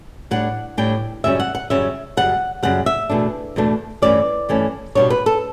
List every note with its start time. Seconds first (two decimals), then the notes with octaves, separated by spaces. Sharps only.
0.31 A2 G3 D4 F#5
0.77 A2 G3 D4 G5
1.24 F#2 C#3 G3 C#4 E5
1.40 F#5
1.55 F#5
1.70 F#2 C#3 G3 C#4 E5
2.17 F#2 C#3 G3 F#5
2.63 F#2 C#3 G3 F#5
2.86 E5
3.09 E2 B2 A3 D4
3.56 E2 B2 A3 D4
4.02 G2 E3 A3 C#4 D5
4.49 G2 E3 A3 C#4
4.95 B2 G3 B3 D4 C#5
5.10 B4
5.26 A4